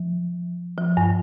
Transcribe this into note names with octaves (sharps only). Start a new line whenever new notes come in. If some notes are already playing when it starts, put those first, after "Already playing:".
Already playing: F3
F3
G2